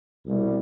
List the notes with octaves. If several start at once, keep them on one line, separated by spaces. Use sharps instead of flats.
C2 B2 G3